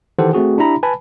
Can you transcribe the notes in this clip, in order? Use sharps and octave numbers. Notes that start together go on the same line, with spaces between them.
D#3 E3 G4 A4 C5 F#5
A3 C4 F#4 G#4
D4 E4 G4 E5 A#5 B5
B4 G#5 A5 B5